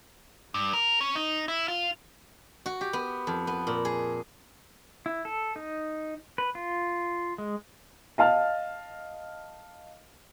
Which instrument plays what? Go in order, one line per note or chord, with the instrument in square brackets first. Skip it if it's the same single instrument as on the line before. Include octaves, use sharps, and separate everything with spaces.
[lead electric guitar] G2
A#4
C#4
D#4
E4
F4
[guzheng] F#4
G4
B3
F2
B3
A#2
G#4
[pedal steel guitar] E4
A4
D#4
B4
F4
G#3
[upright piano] D#5 F5 A5 F6